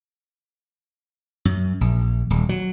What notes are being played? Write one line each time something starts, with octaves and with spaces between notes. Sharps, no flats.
F#2
A#1
D#1
F#3